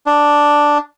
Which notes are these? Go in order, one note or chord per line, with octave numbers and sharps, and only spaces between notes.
D4